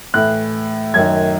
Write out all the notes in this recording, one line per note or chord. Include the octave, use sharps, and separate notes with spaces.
A2 E3 F#6
F#2 D#3 G#6